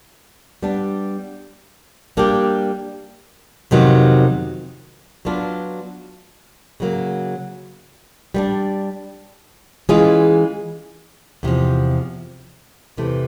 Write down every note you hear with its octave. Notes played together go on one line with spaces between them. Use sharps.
G3 B3 D4
G3 A#3 D4 G4
F2 C3 D#3 F#3 B3
F#3 B3 D4 F4
C#3 F#3 A#3
G3 B3 D4
E3 G#3 C#4 F4 G#4
E2 C3 F3
E2 C3 E3 A3